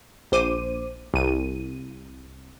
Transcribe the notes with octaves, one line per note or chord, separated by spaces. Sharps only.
A#1 C5 D6 D#7
C2 D#7